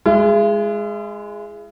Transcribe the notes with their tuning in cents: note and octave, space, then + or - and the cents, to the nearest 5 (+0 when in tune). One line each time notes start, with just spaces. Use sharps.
G#3 +0 E4 +45